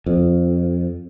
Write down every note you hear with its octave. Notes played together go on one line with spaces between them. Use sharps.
F2